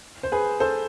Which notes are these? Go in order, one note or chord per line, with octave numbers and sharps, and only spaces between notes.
C5
G#4 B4
A4 C5